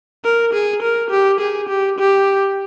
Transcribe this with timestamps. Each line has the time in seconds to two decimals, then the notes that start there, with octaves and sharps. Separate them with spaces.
0.25 A#4
0.54 G#4
0.82 A#4
1.11 G4
1.40 G#4
1.69 G4
1.99 G4